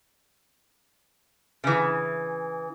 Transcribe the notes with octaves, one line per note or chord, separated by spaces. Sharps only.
C#3 E3